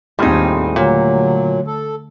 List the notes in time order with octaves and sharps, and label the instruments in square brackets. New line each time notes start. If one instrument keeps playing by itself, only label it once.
[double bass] D#2 C4 [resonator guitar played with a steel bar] A2 D#4 [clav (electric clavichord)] G3 F4 G#4
[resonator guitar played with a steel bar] A#2 [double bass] D3 A3 [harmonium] F#3
[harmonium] A4